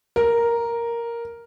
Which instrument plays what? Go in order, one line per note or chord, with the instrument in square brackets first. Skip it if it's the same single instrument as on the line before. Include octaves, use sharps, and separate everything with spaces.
[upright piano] A#4